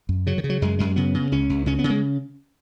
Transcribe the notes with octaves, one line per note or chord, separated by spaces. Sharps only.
F#2
C#3 F#3
D#3
C#3
F#3
F#2 G#3
F#2 G#3
C#3 B3
C#3
C#2 C#4
C#2
C#3 C#4
B3
C#3
G#3